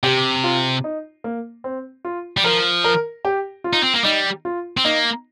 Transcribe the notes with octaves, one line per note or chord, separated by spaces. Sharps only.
C3 G4
F4
D#4
A#3
C4
F4
G3
F3 A#4
A#4
G4
F4
D#4
C4
A#3
G3 D#4
F4
C4
A#3 D#4